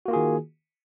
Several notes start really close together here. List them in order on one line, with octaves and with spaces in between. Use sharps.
F#4 A#3 F4 G#4 D#3